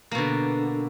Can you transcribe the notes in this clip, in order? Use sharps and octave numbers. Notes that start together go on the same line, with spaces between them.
B2 D3 A#3